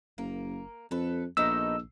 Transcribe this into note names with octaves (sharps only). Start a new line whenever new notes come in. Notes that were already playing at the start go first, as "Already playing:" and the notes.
F#1 A#3
F2 A4 B4
A#1 A3 B3 D#4 E6